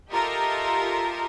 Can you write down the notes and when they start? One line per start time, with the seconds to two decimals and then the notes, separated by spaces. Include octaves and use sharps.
0.11 F4 G4 A4 A#4 D#5 E5